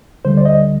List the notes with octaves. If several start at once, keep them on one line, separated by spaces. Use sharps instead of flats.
D2 D3 G3 C5
D5
D#5